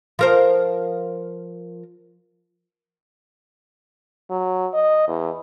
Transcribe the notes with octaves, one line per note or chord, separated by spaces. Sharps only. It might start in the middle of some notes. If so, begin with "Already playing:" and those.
F3 A#4 C5
F#3
D#5
E2